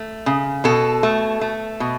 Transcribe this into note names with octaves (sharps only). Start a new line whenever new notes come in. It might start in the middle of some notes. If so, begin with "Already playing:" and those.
Already playing: A3
C#3
B2 A4
A3
A3
B2